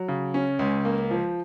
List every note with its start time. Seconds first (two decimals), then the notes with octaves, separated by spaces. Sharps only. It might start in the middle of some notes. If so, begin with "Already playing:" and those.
Already playing: F#3
0.08 C#3
0.34 C#4
0.59 C#2
0.85 A#3
1.11 F3